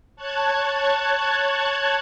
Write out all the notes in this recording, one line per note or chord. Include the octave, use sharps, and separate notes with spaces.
C#5 A5 F#6 G#6